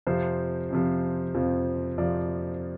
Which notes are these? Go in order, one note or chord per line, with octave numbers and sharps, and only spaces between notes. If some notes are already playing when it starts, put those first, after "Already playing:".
F2 C3 F3 C5
F2 C3 F3
F2 C3 F3
F2 C3 F3 D5